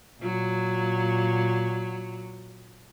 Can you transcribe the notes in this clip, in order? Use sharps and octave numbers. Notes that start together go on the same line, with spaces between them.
A#2 F#3